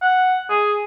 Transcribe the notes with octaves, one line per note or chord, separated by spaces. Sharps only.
F#5
G#4